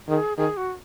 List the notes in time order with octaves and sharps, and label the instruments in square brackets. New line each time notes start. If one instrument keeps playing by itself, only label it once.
[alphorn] D#3 [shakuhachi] G#4
[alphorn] D#3 [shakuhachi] G#4
[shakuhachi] F#4